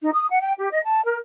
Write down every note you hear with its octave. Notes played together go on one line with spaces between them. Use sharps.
D#4
D#6
F#5
G5
G4
D#5
A5
A#4